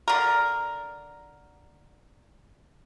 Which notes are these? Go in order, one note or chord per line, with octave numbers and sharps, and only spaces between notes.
D3 A#4